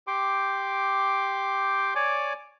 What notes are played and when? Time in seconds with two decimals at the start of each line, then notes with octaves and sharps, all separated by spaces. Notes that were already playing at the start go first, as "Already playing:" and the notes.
0.07 G4 G5 C6 D6
1.95 C#5 D5 G#5 D6